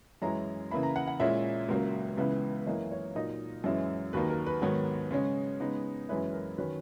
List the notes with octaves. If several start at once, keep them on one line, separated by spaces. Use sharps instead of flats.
F#2 E3 G#3 C#4 E4 A#5
C#3 E3 A#3 E4 B5
A#5
F#5
F#5
A#2 G#3 C#4 E4 E5
C#2 C#3 F#3 A#3
C#2 C#3 E3 B3 E4
F#2 E3 A#3 C#4 E4 D#5
C#5
A#2 F#3 A#3 D#4 D#5
F#2 E3 G#3 C#4 E4
D#2 D#3 F#3 A#3 D#4 B4
A#4
B4
G#2 D#3 F#3 B3 C#5
C#3 G#3 C#4
C#3 G#3 B3 D#4
F#2 E3 G#3 C#4 E4 B4
A#4
D#3 F#3 C#4 B4